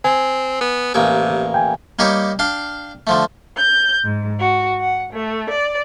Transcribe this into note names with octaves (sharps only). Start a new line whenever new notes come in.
C4 G#5
B3
A1 C3 A#3 G#4
G5 G#5
G3 A#3 D#4 G4 C#5
D4 F5 G5
D3 F3 A3
G6
G#2
F#4
F#5
A3
D5